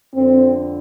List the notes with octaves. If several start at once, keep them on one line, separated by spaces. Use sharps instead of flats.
F2 D3 C4